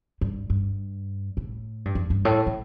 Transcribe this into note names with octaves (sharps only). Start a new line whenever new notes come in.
G2
G2
A2
G2
F2
G2
A2
A2